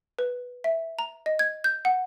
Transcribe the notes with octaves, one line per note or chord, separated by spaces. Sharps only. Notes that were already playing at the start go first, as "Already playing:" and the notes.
B4
E5
A#5
D#5
G#6
G6
F#5